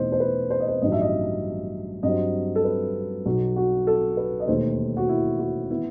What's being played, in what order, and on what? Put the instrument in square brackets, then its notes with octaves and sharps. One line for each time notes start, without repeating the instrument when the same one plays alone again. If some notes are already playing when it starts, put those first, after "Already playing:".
Already playing: [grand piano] E2 B2 A3 D#4 C5 D#5
C5
B4
C5
D#5
C5
A1 G2 D#3 F#3 D#5
E5
D#5
G2 F#3 C4 D#5
A4
B4
B1 B2 F#3 F#4
F#4
A4
B4
D#5
E1 D#2 D#3 A3 C5
F#4
E4
F#4
E3 B3 E4